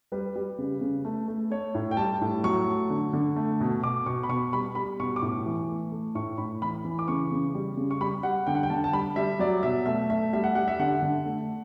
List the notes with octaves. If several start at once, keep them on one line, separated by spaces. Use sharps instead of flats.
G3 B4
G3
C#3
C#3
A3
A3
A3 C#5
A2
G5
G3 A5
A2
F#3 C#6
A3
D3
D3
A3
B2
B2 D6
B2 C#6
B5
B2 C#6
G3 B5
G3 B5
B2 C#6
D6
A2 C#6
E3
A3
A3
A2 C#6
A2 B5
E3 B5
E3
D6
C#3 C#6
C#3
G3
C#3
C#6
G3 B5
G3 F#5
D3 G5
F#5
G5
D3 A5
A5
G3 B5
G3 E5
F#3 D5
B2 E5
A3 E5
A3 E5
G3 E5
F#5
G3 F#5
E5
D3 F#5
D3
A3